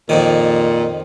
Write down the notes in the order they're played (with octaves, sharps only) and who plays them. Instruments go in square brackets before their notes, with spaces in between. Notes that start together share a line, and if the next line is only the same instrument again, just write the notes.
[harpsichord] F2 D#3 [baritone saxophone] A#2